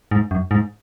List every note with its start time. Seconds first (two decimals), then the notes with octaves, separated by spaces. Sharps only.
0.11 G#2
0.31 F#2
0.51 G#2